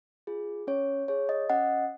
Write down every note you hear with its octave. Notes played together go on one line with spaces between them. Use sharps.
F4 G#4
C#4 C#5
G#4 C#5
D#5
C#4 D#5 F#5